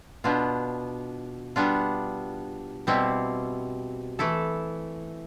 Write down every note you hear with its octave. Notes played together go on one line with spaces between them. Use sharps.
B2 B3 D4 F4
G3 B3 D4 F4
B2 G3 C4 E4
E3 A3 E4 A4